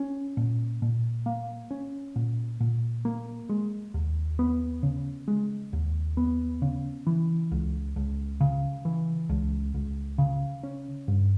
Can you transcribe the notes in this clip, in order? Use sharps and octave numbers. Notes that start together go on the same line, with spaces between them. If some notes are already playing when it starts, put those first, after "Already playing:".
Already playing: C#4
A#2
A#2
A#3
C#4
A#2
A#2
A#3
G#3
D#2
B3
C#3
G#3
D#2
B3
C#3
E3
C#2
C#2
C#3
E3
C#2
C#2
C#3
C#4
G2